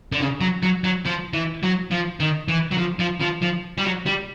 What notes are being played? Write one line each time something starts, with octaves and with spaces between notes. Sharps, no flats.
D3
C#3
F#3
F#3
F#3
F3
E3
F#3
F3
D#3
E3
F#3
F3
F3
F3
F3
G3
F#3
G3